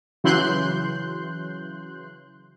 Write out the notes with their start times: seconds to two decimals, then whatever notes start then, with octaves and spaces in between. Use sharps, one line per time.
0.24 C#3 E3 F#3 C6 F#6 G6